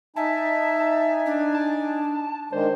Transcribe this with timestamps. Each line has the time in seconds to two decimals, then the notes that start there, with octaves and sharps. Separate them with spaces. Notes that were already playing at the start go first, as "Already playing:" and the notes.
0.16 D#4 E5 G#5 A5
1.26 D4
1.54 A5
2.52 D#3 G#3 D4 C5